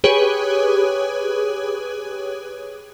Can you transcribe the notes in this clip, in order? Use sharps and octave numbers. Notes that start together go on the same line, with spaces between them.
G4 G#4 B4 C#5